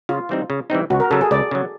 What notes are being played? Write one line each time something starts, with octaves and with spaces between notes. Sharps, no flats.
C#3 F4
E3 G3 C4 D#4
C#3
E3 G3 C4 D#4
C#2 F#4
A#4
C#3 F#3 A4
G#4
C#2 D5
C#3 F#3